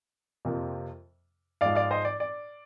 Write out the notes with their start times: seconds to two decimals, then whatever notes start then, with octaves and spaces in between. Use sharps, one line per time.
0.45 F2 C3 F3 A#3
1.61 G#2 F3 G#3 D5 F5
1.75 D5 F5
1.91 C5 D#5
2.05 D5
2.20 D5